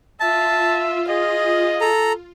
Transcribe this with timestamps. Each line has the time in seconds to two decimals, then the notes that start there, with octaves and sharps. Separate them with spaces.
0.20 F4 E5 A5
1.09 G#4 D#5
1.81 A4 A#5